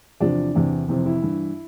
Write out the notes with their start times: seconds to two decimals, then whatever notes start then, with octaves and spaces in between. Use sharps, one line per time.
0.20 E2 C3 F3 D4
0.55 E2 C3 E3
0.88 F2 C3 E3
1.06 E4
1.22 G2 E3